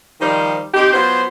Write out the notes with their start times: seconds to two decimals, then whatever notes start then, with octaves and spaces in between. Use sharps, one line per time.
0.20 D#3 F3 G3 D#4 C5
0.74 C4 D#4 G4
0.93 F#3 B3 F4 C5